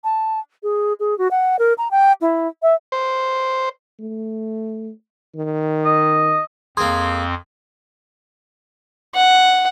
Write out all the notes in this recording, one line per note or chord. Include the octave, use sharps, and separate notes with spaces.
A5
G#4
G#4
F#4
F#5
A#4
A#5
G5
E4
E5
C5
A3
D#3
D#5
F2 A#3 C4 G#4 C6 D#6 G#6
F#5